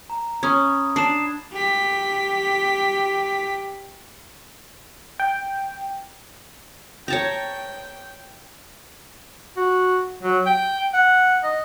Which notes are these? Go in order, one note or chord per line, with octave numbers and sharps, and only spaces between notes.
A#5
C#4 B5 D#6 G#6
D4 C7 E7
G4 B6
G5
C#5 G5 A5 A#5
F#4
F#3
G5
F#5
D#5